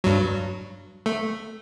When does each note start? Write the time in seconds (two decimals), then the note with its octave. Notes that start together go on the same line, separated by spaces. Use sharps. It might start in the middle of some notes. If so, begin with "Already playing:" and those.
0.04 G2 F#3
1.06 A3